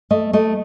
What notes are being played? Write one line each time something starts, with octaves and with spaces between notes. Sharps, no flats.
A3 D#5
A3 D#5